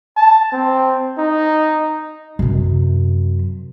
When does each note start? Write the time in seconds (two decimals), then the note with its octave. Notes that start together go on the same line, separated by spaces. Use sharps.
0.17 A5
0.53 C4
1.18 D#4
2.39 F#2 C3